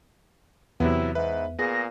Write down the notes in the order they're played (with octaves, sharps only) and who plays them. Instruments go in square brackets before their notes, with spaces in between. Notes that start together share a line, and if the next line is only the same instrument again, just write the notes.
[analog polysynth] E2 [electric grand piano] C3 F#3 B3 [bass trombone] E4
[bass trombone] G#2 [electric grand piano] B4 [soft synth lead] E5
[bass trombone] A#2 [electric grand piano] B3 G#4 [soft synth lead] A#6